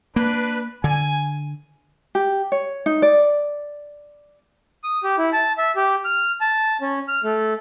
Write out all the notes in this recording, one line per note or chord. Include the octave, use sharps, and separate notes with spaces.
A#3 D4 B4
D3 G#5
G4
C#5
D#4
D5
D#6
G4
E4
A5
E5
G4
F6
A5
C#4
F6
A3